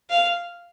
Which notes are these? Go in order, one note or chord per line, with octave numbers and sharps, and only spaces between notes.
F5